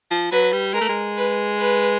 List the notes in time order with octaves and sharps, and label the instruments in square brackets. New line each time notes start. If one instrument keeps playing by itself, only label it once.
[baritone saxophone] F3
[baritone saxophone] F#3 [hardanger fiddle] B4
[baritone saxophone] G3
[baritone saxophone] G#3 [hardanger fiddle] A#4
[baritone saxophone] A3
G#3
[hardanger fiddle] B4
B4